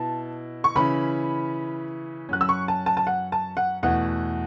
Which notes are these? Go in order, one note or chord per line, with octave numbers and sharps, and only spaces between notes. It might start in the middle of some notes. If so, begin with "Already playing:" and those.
Already playing: B2 B3 E4 A5
C#6
C#3 E3 C#4 E4 B5
F#2 F#3 C#4 F#6
E6
C#6
A5
A5
A5
F#5
A5
F#5
E2 B2 A3 E4 F#5